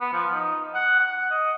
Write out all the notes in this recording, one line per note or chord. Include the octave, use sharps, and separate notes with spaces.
B3
F3
D#4
F#5
F#5
D#5